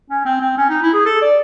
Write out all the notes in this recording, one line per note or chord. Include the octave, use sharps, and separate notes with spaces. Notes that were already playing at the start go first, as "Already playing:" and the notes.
C#4
C4
C4
C#4
D#4
E4
G#4
A4
D5